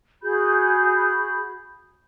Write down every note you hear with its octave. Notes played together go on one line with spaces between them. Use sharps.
F#4 G#4 B5 G6